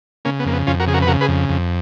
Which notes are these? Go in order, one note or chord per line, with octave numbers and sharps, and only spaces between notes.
C#3 A#3 C#4
B3
F2 A#3
B3
F2 C#4 F4
F#4 A#4
C#3 G#4
F#4 A#4
B4
C#3 F#4 A#4
G#4 B4
F2
F2